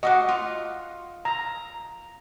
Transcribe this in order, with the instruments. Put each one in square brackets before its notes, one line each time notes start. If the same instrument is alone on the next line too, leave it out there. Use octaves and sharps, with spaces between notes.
[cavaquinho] F#4 F5 D6 [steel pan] D#5 F#5
[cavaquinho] F4
[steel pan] A#5